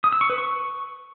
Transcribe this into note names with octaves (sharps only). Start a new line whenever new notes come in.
D#6
E6
C#6
B4
C#6